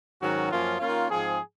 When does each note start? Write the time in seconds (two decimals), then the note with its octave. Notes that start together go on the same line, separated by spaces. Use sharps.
0.21 G#2 D#3 F#3 C#4 F#4
0.50 F#2 F3 A#3 C#4 F4
0.79 D#3 A#3 C#4 F4
1.09 G#2 F3 C4 G#4